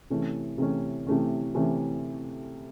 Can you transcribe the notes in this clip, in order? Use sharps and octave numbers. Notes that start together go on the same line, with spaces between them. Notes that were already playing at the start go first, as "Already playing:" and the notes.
C3 E3 A3 C#4
C3 E3 A3 C#4
C3 E3 A3 C#4
C3 E3 A3 C#4